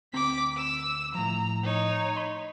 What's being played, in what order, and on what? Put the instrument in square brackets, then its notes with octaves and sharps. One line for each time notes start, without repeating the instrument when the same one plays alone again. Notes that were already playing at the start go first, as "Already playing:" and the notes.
[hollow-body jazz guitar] D2 C4 A#5 [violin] D6 B6
[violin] E6
[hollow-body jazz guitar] A2 F3 [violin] A#5
[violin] D#4 C#5
[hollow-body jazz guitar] B5 C6